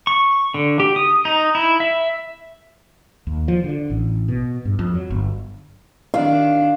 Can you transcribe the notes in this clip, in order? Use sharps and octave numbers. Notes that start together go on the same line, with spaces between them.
C#6
D3
G4
D#6
D#4
E4
E5
D#2
F3
D3
A1
B2
G2
F2
F#3
G1
D#3 D4 F5